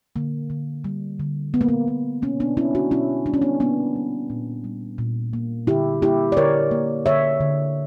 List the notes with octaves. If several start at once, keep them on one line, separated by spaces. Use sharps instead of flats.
D3 A#3
D3
G3
D3
G3 B3
A#3
B3
A#3
B2 A#3 C#4
B3 D4
A#3 C#4 E4
D4 F#4
B2 C#4 E4
G3 D4
C#4
B3 D4
A#3 B3 D4
G3
A#2
G3
A#2
A#3
D3 E4 G4
A#3 E4 G4
D5
D3 A#4 C#5
A#3
D3 C#5 E5
D3